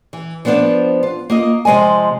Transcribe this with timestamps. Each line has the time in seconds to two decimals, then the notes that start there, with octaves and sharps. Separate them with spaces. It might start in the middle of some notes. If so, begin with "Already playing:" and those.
0.13 E3
0.45 F3 B3 D4 A#4 C5 D5
1.03 F4
1.30 A#3 F4 D#5
1.65 C3 F3 G#3 D#5 G#5